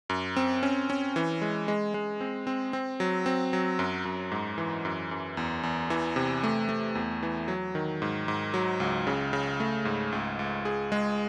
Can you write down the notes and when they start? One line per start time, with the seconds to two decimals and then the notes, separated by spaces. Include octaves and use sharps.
0.09 F#2
0.36 C4
0.63 C#4
0.90 C#4
1.16 E3
1.42 G#3
1.68 G#3
1.94 G#3
2.21 C4
2.47 C4
2.73 C4
3.00 F#3
3.26 C4
3.53 F#3
3.79 F#2
4.05 F#2
4.32 G#2
4.58 E3
4.85 F#2
5.11 F#2
5.37 E2
5.63 E2
5.90 E3
6.16 C3
6.44 A3
6.69 A3
6.95 E2
7.23 E3
7.48 F#3
7.75 D#3
8.02 G#2
8.28 G#2
8.54 F#3
8.80 C#2
9.07 C#3
9.33 C#3
9.60 A3
9.85 G#2
10.12 C#2
10.39 C#2
10.65 G#4
10.92 G#3